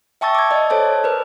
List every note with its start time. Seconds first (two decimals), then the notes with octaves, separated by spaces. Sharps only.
0.21 E5 G5 A5 C#6 E6 A6
0.35 D6 G#6
0.51 D5 D#5
0.70 A4 C5 C#5 A5
1.04 A#4 B4